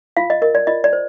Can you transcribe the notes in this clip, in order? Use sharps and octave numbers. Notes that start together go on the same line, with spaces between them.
F4 F5
D#5
A#4 D#5
D5
F4 D#5
D5
C5